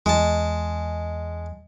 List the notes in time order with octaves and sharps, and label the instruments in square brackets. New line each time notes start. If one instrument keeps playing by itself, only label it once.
[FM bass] E2 [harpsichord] G#3 A5